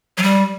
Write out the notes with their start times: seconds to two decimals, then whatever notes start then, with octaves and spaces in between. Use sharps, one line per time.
0.18 F#3
0.23 G3